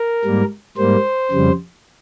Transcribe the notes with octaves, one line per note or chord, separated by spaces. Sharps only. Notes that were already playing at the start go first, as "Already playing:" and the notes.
Already playing: A#4
G#2 G3 A#3
G#2 G3 A#3 C5
F2 C#3 G3